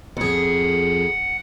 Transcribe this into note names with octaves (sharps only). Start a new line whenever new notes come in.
F2 G#4 F#5